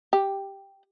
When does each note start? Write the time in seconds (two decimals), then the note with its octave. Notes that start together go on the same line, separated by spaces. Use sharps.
0.13 G4